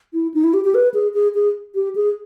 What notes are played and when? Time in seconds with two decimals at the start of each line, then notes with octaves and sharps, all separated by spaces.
0.13 E4
0.34 D#4
0.44 E4
0.54 G4
0.64 G4
0.75 B4
0.94 G#4
1.14 G#4
1.35 G#4
1.75 G4
1.95 G#4